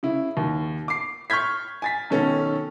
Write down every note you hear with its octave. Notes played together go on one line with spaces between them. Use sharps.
C#3 E4
D#2
D6 C7
C#6 F6 G6 G#6 B6
G#5 A6 B6
B1 D#3 C#4 A4